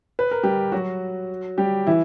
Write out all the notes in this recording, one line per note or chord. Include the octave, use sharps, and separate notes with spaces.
B4
A#4
G3 G4
F#3 F#4
G3 G4
E3 E4